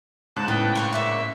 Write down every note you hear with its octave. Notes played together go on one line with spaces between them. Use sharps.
G#2 C#3 A5 F#6
A2 B3 B4 G5 A5
D4 F5 C#6
A#3 D5 E5 C#6